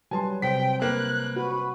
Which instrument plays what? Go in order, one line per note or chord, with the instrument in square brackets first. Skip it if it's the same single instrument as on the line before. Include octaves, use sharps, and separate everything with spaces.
[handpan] F#3 G3 B4 [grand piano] G#5 A5 C6
[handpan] C3 C5 [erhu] G5 [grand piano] B6
[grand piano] A#3 [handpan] B4 [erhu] F#6
[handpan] F#4 [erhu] B4